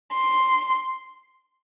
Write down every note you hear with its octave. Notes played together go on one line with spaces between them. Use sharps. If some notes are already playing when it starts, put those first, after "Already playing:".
C6